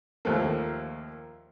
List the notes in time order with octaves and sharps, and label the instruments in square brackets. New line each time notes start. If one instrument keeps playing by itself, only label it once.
[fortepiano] D#2 F3 A3 A#3